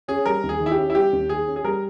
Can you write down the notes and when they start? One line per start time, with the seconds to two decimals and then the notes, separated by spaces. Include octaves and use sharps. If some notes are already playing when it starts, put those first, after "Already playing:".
0.08 C#4 G#4
0.26 G3 A#4
0.43 D#2
0.49 G#4
0.60 D#3
0.66 E4
0.72 G4
0.78 C#4
0.90 E4
0.95 G3 G4
1.13 D#2
1.29 D#3 G#4
1.47 C#4
1.56 G#4
1.64 G3 A#4